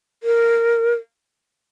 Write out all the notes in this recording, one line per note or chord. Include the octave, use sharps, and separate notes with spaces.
A#4